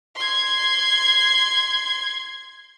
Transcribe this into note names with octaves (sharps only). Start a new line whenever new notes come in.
C6 G#6